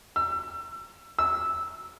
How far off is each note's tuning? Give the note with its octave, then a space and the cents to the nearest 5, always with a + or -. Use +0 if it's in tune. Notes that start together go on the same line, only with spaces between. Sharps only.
E6 +30
E6 -10